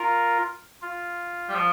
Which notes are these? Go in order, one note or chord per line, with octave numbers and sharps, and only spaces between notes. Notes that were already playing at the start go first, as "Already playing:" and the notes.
Already playing: F4 A#4
F4
G3
F3